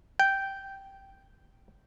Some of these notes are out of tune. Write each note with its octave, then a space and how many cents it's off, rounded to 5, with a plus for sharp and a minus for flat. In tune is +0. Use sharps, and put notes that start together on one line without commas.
G5 -10